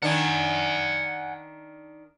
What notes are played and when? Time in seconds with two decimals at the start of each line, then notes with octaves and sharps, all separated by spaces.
0.03 D#3 D4 F#5 G#5